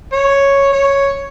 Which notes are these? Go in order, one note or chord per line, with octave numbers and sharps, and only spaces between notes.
C#5
C#5